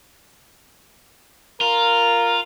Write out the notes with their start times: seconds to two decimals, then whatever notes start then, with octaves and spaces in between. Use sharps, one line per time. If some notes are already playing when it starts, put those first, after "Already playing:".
1.61 F4 A#4